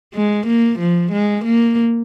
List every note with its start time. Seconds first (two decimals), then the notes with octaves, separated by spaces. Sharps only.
0.14 G#3
0.47 A#3
0.79 F3
1.12 G#3
1.45 A#3